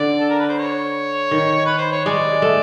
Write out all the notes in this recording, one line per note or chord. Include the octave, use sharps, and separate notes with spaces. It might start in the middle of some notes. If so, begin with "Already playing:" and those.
Already playing: D3 D5
A4
A#4
B4
C5
C#5
D#3
B4
C5
C#5
G#3 D5
A3